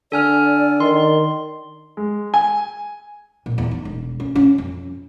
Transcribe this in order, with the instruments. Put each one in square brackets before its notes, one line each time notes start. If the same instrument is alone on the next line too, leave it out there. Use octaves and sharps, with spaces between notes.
[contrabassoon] D3 [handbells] A4 G#5 F6 [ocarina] D5
[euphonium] D#3 [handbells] C6
[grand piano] G#3
G#5
[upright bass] A#2
E2
D#4
E1
C#4
C#4
F2